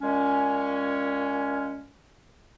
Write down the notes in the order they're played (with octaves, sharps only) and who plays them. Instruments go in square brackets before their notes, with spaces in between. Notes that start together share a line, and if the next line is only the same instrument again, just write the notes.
[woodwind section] A#2 G#3 C#4